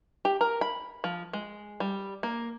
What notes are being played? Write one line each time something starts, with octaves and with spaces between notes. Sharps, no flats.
G4
A#4
B5
F3
G#3
G3
A#3